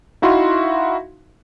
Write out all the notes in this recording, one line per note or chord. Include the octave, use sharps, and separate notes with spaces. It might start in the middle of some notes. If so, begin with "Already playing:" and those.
D#4 E4 F#4 E5 F5 C6